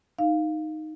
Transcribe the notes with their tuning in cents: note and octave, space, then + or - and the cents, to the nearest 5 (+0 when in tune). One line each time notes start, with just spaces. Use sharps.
D#4 +0 F5 +0